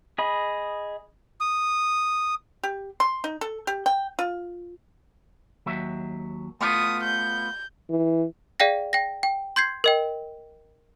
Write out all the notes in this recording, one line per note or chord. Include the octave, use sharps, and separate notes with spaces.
G#4 D#5 B5
D#6
G4
C6
D#4
A4
G4
G5
F4
D#2 F#3 E5
A3 B3 F4 D#6
G6
E3
G#4 D5 F5 G5 A#6
G5 A#6
G5
C6 G6 G#6 C7
A#4 D#5 G5